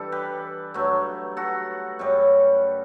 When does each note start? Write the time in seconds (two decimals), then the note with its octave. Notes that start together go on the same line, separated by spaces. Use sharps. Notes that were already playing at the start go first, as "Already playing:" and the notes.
Already playing: G2 E3 G3 A4
0.12 G4 B4
0.74 G2 F#3 A3
1.37 F#4 A4
1.99 F#2 C#3 G3